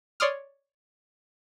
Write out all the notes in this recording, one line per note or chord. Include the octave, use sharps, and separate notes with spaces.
C#5 D5 C6 D6 D#6 F6